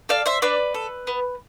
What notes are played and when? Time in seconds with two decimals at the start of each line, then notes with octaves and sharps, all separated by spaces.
0.09 A4 D5 F5
0.26 C5 E5
0.42 D4 B4 D5
0.74 A4
1.07 B3